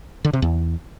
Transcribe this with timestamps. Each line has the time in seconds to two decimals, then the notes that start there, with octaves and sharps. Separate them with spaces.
0.25 D3
0.33 C3
0.42 E2